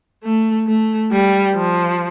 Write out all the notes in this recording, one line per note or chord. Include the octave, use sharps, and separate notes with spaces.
A3
A3
G3
F3